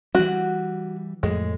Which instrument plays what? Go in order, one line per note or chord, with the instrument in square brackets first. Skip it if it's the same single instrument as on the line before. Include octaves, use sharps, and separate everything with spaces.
[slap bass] E3 G3 [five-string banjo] F#4
[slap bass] F2 A2 [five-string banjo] G#3